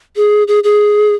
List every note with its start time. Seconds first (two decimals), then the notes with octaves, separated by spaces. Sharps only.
0.16 G#4
0.48 G#4
0.64 G#4